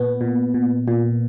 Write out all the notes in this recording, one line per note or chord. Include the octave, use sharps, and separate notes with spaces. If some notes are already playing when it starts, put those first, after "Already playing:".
Already playing: A#2 B3
A#2
A#2
A#2